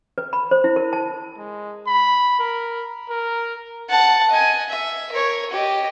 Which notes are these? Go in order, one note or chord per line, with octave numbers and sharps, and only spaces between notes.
B4
B5
C5
E4
A#4
A5
G#3
B5
A#4
A#4
F#5 A5
D#5 G#5
E5
A#4 C#5
G4 D#5